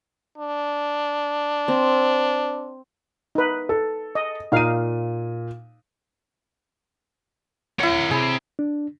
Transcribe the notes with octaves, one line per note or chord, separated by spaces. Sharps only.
D4
C4
D#4 B4
A4
D#5
A#2 D#4 F5 D#7
A#3 E4 C#5 F#5
C3 G#4 B5
D4